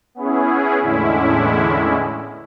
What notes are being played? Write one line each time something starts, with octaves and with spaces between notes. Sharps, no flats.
B3 C#4 E4 G#4
E2 A2 D3 G#3 C#4 E4